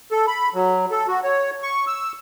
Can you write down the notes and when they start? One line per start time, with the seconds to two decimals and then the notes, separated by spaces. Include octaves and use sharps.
0.11 A4
0.27 B5
0.54 F#3
0.91 A4
1.08 F#4
1.24 C#5
1.63 C#6
1.87 E6